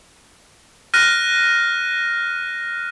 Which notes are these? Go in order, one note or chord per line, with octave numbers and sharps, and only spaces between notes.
F6 F#6 A#6 D#7